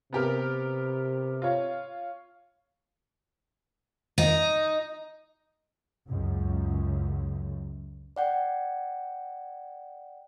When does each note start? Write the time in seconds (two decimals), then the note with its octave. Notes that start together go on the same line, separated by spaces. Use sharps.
0.13 C3 B3 G4 A#4
1.42 F4 C#5
4.18 D#4
6.08 C#2 F#2
8.16 D5 F#5 G5